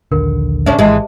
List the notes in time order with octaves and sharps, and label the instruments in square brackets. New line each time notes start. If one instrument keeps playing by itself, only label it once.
[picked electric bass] A#1 D#2 D3 [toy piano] A#4
[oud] C#3 C#4 D4 [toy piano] G#4 C5 E5
[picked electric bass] G#1 [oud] E3 G#3 [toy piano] G4 D#5 A5